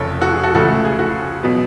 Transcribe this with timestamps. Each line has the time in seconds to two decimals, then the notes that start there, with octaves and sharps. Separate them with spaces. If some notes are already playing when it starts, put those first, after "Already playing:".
Already playing: F1 F2 C#3 A4 C#5
0.21 F#4 A4
0.32 G#4
0.43 F#4 A4
0.55 C#2 C#3 F3 A3 F#4 A4
0.85 G#4
0.99 F#4
1.43 B2 F#3 B3